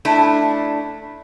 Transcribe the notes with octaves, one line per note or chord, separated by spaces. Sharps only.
A3 D4 E4